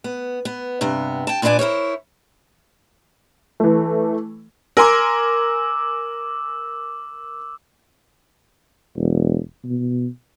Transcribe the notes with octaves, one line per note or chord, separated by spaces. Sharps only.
B3
B3
G2 C3 B3
G5 A5
A#2 B3 D4 C5 D5 G#5
E4 A#4 C5 C#5
E3 A3
A#4 G#5 C6 D6 E6
E1
B2